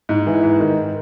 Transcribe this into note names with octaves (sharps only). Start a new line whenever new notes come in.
G#2
E3
G#2
D#3